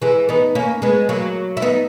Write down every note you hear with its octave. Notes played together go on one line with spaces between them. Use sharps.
E3 G#3
B3 D#4
A#3 C#4
G#3 B3
F#3 A#3
E4
B3 D#4